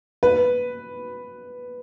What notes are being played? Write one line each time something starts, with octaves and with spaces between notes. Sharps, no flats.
B4